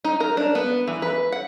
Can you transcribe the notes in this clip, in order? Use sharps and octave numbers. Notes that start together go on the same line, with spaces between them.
D#4
A#4
D4
B3
E3
B4
F#5